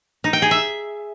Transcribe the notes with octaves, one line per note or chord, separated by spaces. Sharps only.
D#4
G5
G#4
E5